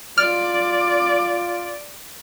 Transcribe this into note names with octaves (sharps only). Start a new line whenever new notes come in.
F4 D5 F6